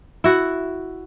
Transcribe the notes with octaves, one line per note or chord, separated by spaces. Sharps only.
E4 F#4